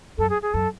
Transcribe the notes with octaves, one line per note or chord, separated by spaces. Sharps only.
F#2 A4
G#4
G#4
F#2 A4